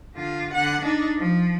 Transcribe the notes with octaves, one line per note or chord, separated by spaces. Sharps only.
D3 F4
D3 F#5
D4 D#4
F3